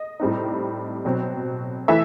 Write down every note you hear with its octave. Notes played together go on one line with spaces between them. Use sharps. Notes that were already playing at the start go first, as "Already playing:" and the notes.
Already playing: D#5
A2 G3 C4 D#4
B2 F#3 C4
E3 A3 E5